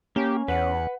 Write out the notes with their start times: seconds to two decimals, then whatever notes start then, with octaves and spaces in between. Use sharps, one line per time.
0.16 A#3 C#4 G4
0.48 E2 B4 F#5